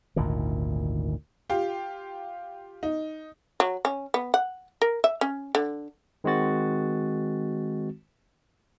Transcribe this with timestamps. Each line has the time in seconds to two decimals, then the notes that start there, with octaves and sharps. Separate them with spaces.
0.16 G#1 D2 A#2 D#3
1.49 F4 G4
2.83 D#4
3.60 F#3
3.85 C#4
4.14 B3
4.34 F#5
4.82 A#4
5.04 E5
5.21 C#4
5.55 D3
6.24 D#3 G#3 C4 F#4 A6